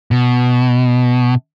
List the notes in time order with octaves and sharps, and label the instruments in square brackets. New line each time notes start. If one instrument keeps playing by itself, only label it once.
[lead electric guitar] B2